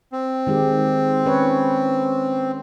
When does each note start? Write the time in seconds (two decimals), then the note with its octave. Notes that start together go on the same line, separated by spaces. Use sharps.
0.12 C4
0.47 D#3 G#3 G4
1.25 C#4 B4 C#5